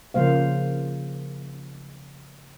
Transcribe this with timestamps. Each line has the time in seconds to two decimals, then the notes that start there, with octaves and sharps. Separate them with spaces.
0.14 C#3 F3 A#3 C5 F5